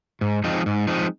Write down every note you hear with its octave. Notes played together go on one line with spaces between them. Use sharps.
G#2
F3 G#3 C4 D#4
G#2
F3 G#3 C4 D#4